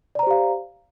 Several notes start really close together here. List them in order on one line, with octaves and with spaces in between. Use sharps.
D5 A#5 C5 G4 F5